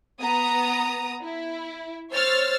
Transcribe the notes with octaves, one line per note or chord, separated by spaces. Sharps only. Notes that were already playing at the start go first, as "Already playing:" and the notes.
B3 A#5 D#6
E4
C5 C#5 E6 F6 A6